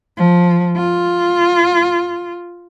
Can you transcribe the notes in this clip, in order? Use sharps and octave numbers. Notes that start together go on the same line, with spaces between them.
F3
F4